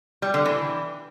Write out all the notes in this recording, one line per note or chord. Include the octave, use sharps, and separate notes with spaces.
G3
D3
E3